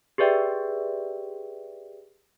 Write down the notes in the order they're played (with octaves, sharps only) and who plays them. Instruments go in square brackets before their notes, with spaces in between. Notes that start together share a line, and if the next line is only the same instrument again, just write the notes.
[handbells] G4 G#4 B4 D5 E5 G5